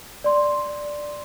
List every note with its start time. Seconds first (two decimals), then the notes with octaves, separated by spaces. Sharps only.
0.24 D5 C6